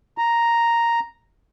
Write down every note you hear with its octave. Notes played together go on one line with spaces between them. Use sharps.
A#5